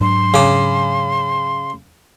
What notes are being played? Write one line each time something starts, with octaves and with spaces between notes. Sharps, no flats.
G#2 F#3 D4 C6
C#3 D6